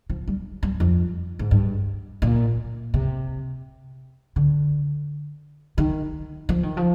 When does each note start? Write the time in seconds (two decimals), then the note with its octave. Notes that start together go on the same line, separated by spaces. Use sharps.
0.10 F3
0.28 G3
0.63 G2
0.80 F2
1.39 G#2
1.51 G2
2.22 A#2
2.94 C3
4.36 D3
5.78 D#3
6.49 F3
6.63 D#3
6.77 F3